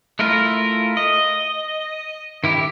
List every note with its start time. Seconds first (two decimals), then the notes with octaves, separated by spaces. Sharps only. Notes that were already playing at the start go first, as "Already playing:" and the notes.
0.19 A3 E4 F4 A#4
0.97 D#5
2.44 D#3 E4 G4